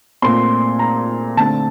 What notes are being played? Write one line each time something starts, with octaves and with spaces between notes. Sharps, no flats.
A#2 A3 C4 C6
A#5
D3 A3 C4 A5